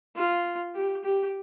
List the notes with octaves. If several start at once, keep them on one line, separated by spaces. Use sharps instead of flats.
F4
G4
G4